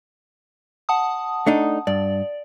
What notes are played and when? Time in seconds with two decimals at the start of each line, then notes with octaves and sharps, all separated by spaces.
0.89 F#5 A5 D#6
1.47 A3 D4 D#4
1.87 G2 D5